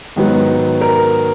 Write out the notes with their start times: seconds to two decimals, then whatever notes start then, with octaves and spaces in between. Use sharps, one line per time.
0.16 G#2 D#3 F#3 B3
0.81 A#4